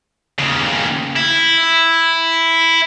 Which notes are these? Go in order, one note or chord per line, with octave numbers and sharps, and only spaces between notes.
D#2 C#3
E4